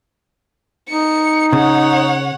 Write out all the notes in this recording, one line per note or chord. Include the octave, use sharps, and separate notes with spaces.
D#4 C#7
C#3 C#5 F#5